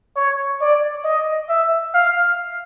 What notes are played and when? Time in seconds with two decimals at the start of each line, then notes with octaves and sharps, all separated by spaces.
0.16 C#5
0.61 D5
1.04 D#5
1.49 E5
1.94 F5